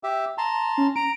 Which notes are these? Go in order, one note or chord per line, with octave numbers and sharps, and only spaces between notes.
G4 E5
A5 A#5 C6
C#4
A#5 D7